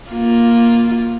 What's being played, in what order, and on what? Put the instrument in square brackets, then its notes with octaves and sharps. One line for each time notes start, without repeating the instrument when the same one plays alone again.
[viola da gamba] A#3 F4